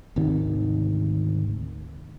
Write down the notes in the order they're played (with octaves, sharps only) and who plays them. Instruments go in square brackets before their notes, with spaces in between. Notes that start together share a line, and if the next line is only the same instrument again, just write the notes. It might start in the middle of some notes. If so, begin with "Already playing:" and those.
[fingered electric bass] G#1 D2 C3 D#3